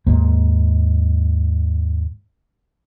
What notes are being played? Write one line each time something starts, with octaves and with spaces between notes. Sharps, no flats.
D#2 G#2 A#3